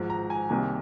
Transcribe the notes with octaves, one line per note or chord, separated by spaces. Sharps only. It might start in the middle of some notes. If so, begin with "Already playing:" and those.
Already playing: G#1 G#2 F3
A#5
G#5
C2 C3 D#3 A#3 G#5